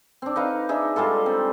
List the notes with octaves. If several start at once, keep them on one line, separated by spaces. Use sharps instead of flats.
C4 D4
D#4 B4 F5
D4 D#4 G#4 E5
G3 G#3 F4 A4
C4